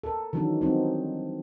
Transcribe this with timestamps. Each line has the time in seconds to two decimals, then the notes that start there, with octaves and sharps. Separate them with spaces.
0.03 A4 A#4
0.33 D#3 E3 F#3 B3 C#4 D4
0.61 F#3 G3 B3 C4 D#4